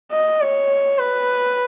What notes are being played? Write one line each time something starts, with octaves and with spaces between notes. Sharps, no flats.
D#5
C#5
B4